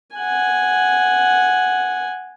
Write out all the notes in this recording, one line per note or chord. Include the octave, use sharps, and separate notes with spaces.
F#5 G#5